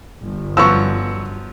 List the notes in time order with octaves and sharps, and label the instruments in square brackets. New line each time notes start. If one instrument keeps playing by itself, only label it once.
[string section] G1
[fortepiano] F#2 F3 B3 [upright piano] C#6 E6